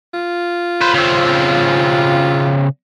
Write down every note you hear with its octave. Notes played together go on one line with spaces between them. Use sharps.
F4
B4 C5
C#3 C4